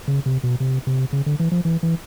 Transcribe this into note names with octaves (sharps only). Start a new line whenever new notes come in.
C#3
C3
B2
C3
C3
C#3
D3
E3
F3
E3
E3